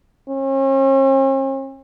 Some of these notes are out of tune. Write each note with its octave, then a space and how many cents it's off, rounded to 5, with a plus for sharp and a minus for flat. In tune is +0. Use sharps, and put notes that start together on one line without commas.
C#4 -45